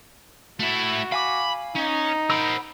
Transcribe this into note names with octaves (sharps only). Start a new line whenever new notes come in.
A3 E4 F#4
F5 G#5 B5 D6
C#4 D#4
A#4 C5 F#5 B5 E6